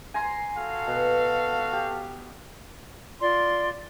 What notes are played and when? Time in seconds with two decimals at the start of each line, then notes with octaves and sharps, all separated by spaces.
0.14 G#5 A#5 C6
0.56 F#4 A4 F5
0.87 B2
1.73 G4
3.21 F4 D5 C6